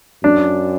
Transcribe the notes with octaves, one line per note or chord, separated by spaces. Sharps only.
F#2 D4